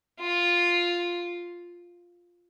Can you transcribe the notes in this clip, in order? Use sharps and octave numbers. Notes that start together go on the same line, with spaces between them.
F4